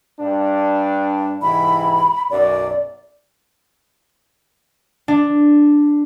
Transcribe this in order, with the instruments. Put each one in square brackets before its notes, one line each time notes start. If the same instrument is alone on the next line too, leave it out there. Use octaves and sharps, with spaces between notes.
[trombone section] G2 D4
[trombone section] G#2 C3 E3 [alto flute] B5
[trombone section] B1 F#2 [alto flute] D5
[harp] D4